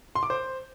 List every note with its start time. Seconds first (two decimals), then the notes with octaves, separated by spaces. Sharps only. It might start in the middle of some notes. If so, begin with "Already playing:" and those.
0.15 C6
0.23 D6
0.30 C5